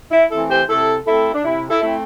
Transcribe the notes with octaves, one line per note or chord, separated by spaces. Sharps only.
E4
E3 A3 C4 E4 A4
G4 C5
C3 E4 A4
A3 C4 E4 A4
D4
C3 E4
E4 A4
A3 C4 E4